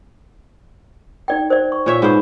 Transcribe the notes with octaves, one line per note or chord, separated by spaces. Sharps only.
D#4 D5 G5
C5 D5
C#6
A#2 C#5 E5
G#2 B3 C5